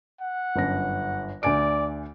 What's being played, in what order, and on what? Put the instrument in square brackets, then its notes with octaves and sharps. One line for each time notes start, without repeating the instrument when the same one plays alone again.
[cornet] F#5
[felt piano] G1 F#2 A#6
[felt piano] D2 G#5 D7 [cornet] D5